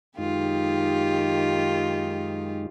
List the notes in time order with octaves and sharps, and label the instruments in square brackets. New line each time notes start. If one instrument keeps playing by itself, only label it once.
[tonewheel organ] F#2 G#3 D#4 [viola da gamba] D#3 F4 G4